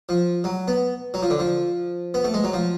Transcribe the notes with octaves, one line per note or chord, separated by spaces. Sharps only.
F3
F#3
B3
F#3
F3
D3
F3
B3
A3
G#3
F#3
F3